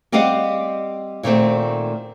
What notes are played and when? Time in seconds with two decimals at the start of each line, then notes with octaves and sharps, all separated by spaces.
0.12 G3 C4 G4 D#5 F5 F#5
1.23 A#2 D#3 A3 C4